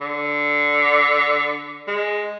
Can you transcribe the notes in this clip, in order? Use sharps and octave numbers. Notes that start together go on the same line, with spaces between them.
D3
G#3